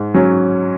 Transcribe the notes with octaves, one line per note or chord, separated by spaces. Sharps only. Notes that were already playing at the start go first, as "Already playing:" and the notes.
Already playing: G#2
F#3 C#4